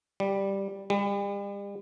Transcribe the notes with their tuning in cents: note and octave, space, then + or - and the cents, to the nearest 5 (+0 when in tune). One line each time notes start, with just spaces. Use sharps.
G3 +0
G3 +40